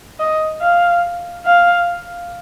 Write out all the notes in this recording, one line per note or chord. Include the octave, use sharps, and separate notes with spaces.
D#5
F5
F5